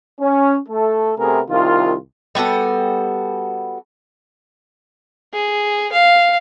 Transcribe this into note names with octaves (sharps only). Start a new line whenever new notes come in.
C#4
A3 A4
C3 A3 B3 G#4 A#4
C2 D#3 F4
G3 B3 F#4 A4
G#4
F5